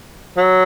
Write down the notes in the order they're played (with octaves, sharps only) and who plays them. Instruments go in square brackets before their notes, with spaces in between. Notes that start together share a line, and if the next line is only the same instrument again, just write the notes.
[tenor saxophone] F#3